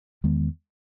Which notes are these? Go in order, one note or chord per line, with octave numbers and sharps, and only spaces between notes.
E2 D#3 G#3 B3